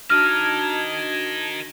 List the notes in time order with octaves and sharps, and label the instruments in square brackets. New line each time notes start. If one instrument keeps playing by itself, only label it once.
[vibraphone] D4 F#4 [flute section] D#4 A5 G#6 [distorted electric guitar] A#4 D#5 [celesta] F6